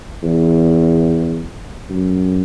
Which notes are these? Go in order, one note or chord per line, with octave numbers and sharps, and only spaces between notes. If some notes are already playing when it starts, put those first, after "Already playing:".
E2
F#2